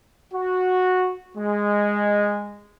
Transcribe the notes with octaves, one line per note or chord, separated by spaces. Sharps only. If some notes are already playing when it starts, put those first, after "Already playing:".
F#4
G#3